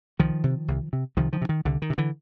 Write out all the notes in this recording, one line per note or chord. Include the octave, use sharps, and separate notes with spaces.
C2 D#3 F3
C3
C2
C3
C2 D#3 F3
D#3 F3
C3
D#3
C2 D3
D#3
C3
D3 E3